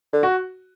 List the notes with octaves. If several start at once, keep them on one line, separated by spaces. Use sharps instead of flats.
D3
F#4